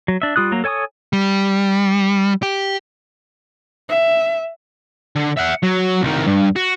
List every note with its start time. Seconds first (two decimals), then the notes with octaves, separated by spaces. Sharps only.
0.08 F#3
0.22 D4 E5
0.36 G3 F4 D#6 F#6
0.52 F#3 A#3 A#5
0.64 A4 C#5 G#5 C#6 D#6
1.13 G3
2.43 G4
3.89 E5
5.16 D3
5.37 E5 F#5
5.63 F#3
6.02 C2 D#3
6.27 G2
6.56 F#4